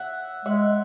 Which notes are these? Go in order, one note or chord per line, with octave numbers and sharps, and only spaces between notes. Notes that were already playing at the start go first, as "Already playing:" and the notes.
Already playing: E5 F#5
G#3 E5 F#5